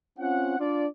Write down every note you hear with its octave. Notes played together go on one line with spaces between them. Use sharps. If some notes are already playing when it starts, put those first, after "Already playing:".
C4 C#4 F4 F#5
D4 F4 D5